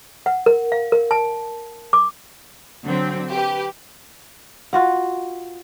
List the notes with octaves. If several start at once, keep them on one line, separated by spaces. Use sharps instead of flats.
F#5
A#4
F5
A#4
A5
D6
D3 F#3 C4
G4 B4
F4 F#4 F#5